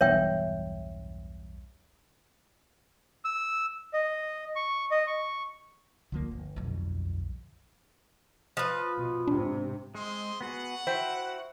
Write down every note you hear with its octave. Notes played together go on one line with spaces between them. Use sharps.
B1 E2 G2 C#5 E5 G5
E6
D#5
C#6
D#5
C#6
D2 D3 F3 A#3
G1
B1 F2
F3 B4
B2
G#2 C3 D4
G#3 C4 D#5 C6
B3 F#4 G#4 F#5
E4 F#4 C5 E5 G5